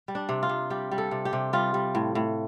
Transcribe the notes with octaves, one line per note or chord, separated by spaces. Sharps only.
G3
D4
C3
F4
C3
G3 G4
G3
A4
C3
G4
C3
G3 F4
G3
A2
A2